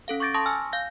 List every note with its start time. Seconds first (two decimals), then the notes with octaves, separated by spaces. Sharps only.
0.08 C#4 A4 F5
0.20 C#6 D6 G6 A6 A#6 D7
0.34 A5 C6 C#6 D#6 A#6
0.46 G#5 E6 F6
0.73 F5 G6 A#6